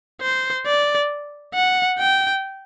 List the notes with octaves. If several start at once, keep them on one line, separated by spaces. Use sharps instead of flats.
C5
D5
F#5
G5